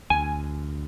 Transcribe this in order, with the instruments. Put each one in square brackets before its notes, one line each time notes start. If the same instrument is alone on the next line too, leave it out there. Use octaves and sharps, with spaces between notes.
[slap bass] D2 [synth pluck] G#5